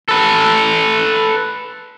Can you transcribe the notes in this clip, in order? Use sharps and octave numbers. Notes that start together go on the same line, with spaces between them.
A4 B4